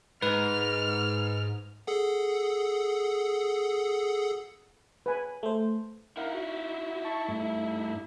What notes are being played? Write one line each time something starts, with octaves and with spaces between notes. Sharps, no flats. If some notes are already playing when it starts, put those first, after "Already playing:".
G#2 B4 F6
G#4 A4 F#5
B4 G#5 B5
A3 C5
D#4 E4 A#4 F5 F#5
F#4
A5 C#6
G2 A3